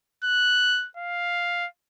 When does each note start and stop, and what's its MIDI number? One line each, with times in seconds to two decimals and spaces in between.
0.24 0.88 90
0.97 1.67 77